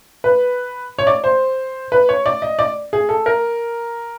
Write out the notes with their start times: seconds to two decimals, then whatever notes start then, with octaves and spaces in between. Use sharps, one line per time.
0.24 B4
0.99 C#5
1.07 D5
1.24 C5
1.92 B4
2.09 C#5
2.26 D5
2.42 D#5
2.59 D5
2.93 G#4
3.09 A4
3.26 A#4